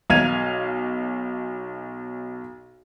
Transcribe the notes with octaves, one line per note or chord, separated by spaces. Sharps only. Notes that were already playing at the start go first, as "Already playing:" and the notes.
B1 F5 G#6 D#7 F7